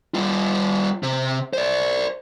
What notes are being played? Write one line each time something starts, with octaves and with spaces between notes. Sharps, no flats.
G3 F4
C3
C5 D5